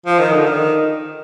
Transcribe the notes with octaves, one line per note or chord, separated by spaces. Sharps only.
F3
D#3
D3
D#3